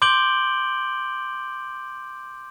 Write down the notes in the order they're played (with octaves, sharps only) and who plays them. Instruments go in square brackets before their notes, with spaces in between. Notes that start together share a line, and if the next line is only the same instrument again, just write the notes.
[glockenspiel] C6 D6 G6 D7 F#7 G7